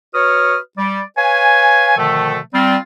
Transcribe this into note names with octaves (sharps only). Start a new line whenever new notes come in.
F#4 B4 C#5 D#6 F6
G3 D5
B4 C#5 F5 G#5
B2 D3 D#3 F3 A3
G3 C4 F4